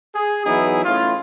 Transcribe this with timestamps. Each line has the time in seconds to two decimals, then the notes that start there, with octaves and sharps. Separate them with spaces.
0.15 G#4
0.46 E3 F#3 B3 D#4 E4 G#4
0.85 A3 C#4 E4 F4